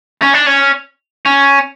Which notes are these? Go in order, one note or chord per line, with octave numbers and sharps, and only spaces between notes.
C#4
D4
C#4
C#4